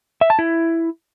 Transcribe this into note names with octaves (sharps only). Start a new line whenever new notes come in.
E5
A5
E4